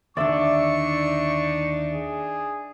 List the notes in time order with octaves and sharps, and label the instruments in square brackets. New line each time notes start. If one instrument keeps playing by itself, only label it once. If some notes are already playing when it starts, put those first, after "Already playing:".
[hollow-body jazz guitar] D#2 D3 [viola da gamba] D4 D#4 [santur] D5 E5 E6 [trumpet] C#6
[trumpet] G#4